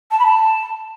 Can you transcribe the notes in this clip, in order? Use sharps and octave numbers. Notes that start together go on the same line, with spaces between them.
A5
B5
A5